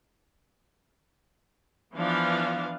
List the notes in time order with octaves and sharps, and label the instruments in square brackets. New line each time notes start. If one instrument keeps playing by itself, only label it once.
[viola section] E3 F3 B3 D4 F5